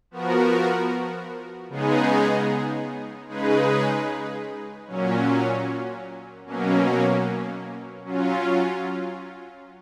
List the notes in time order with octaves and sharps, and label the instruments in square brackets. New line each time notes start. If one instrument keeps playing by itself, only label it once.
[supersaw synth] F3 B3 F#4 A#4
C#3 G#3 B3 D#4 G#4
C#3 G#3 D#4 G#4 B4
A#2 F#3 C#4
B2 F#3 A#3 C#4
F#3 C#4 F4